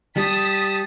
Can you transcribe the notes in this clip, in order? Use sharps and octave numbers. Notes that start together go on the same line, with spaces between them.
G3 A5 D#6 B6